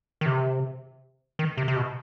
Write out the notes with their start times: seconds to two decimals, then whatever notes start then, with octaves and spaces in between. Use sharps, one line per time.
0.21 D#3
0.26 C3
1.39 D#3
1.57 C3
1.68 C3
1.76 B2